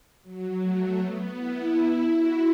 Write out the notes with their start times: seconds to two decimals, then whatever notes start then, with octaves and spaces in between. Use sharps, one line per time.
0.23 F#3
0.61 A3
0.98 B3
1.36 E4
2.12 F#4